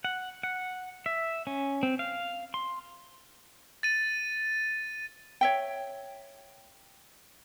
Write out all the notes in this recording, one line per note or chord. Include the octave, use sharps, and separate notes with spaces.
F#5
F#5
E5
C#4
C4
F5
C6
A6 D#7
C#5 E5 G5